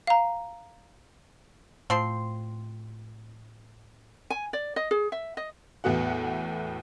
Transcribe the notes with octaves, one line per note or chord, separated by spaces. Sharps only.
F5 A#5
A2 F3 C4 C6
G#5
D5
D#5
G#4
E5
D#5
E2 A2 B3 F#4 F#5